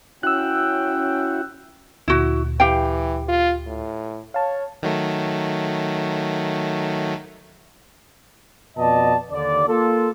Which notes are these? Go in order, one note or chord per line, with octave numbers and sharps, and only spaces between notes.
C#4 E4 F#4 G5 E6 F#6
D2 A#2 E4 F#4
E3 G4 F5 G5
F4
A2
C#5 F5 A5
D#3 F#3 A3
F2 B2 D5 D#5 A5
D#2 D3 D5
A#3 F4 A4